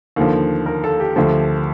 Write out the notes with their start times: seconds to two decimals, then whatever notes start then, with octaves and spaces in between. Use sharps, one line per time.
0.16 D#2 D3 F3
0.66 A#4
0.84 A4
1.00 G4
1.16 D2 D3 F3